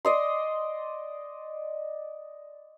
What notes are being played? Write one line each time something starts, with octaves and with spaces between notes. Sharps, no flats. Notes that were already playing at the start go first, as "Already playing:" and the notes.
D5 D#5 C6